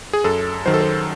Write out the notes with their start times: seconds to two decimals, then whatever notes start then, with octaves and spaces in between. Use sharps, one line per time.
0.13 G#4
0.24 F#2 A4
0.66 D#3 F#3 C5
0.74 A4
0.81 C5